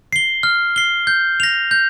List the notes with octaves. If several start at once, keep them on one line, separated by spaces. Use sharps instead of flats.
C7 G7
F6
C7 G7
G6
A#6 F7
G6